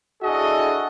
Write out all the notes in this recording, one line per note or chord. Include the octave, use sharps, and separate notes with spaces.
D4 E4 F#4 G#4 A4 D#5